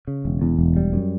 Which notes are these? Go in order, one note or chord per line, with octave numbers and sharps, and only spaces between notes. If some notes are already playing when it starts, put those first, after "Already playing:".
C#3
E1
E2
E1
G3
F#2